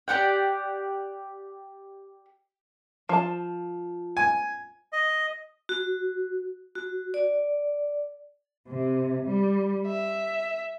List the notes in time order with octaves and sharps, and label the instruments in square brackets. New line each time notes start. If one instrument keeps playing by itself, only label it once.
[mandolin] G4 D5 F#5 G5
[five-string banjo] F3 A5
[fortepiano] G#5
[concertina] D#5
[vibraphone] F#4
F#4
D5
[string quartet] C3
G3
E5